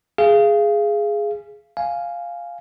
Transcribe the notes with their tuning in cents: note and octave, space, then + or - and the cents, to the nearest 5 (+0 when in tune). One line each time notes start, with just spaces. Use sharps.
G#4 +0 F5 -25
F5 +0 G#5 +0